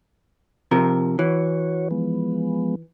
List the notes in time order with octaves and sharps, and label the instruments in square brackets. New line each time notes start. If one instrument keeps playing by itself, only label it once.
[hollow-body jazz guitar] C3 F3 A#4
[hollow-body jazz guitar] E3 [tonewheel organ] F#4 C#5
[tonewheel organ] F3 G#3 B3